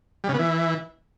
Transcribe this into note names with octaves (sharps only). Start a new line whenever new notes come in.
G3
C#3
B3
E3